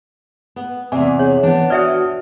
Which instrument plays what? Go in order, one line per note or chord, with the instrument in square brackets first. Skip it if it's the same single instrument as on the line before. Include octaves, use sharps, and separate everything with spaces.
[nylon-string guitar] B3
[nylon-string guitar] E2 C3 [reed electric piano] D5 E5 G#5 [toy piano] D6
[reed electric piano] G#4 [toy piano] C#5
[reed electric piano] E3 [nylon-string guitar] B3 D4
[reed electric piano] F#4 D#6 F6 [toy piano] D5 E5 G5